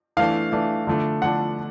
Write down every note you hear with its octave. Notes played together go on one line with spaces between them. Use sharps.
E3 A3 D4 F5
E3 A3 D4
D3 F3 A3 D4
D3 F3 A3 D4 F#5